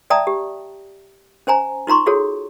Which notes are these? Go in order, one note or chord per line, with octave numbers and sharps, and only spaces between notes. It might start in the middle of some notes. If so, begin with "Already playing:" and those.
D5 E5 G5 A5 A#5 D#6
G4
C#4 C5 G#5 A#5
D#4 F4 A#5 C6 C#6
F4 F#4 G#4 A4 C#5